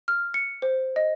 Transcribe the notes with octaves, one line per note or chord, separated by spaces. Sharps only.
F6
C#7
C5
D#5